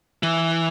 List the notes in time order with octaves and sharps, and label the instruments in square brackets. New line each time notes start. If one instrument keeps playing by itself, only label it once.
[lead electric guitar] E3